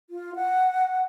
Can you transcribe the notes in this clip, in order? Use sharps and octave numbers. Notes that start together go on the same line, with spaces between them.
F4
F#5